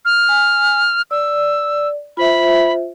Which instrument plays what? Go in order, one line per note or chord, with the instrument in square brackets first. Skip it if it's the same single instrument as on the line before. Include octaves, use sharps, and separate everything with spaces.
[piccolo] F6
[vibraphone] G#5
[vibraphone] D5 [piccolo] E6
[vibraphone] F4 C5 E5 [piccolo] B5